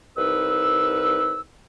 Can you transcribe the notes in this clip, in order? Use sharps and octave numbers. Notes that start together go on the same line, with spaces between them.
C2 D#4 B4 E6